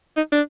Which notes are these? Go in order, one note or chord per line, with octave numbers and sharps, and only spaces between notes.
D#4
D4